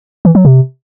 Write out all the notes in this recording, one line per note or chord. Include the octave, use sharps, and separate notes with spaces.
E3
F#3
C3